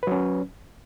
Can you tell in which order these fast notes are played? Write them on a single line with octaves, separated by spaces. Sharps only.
B4 F#3 C#4